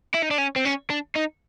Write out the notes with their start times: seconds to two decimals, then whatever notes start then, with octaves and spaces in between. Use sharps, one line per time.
0.14 E4
0.23 D#4
0.31 D4
0.38 C#4
0.56 C4
0.65 C#4
0.90 D4
1.16 D#4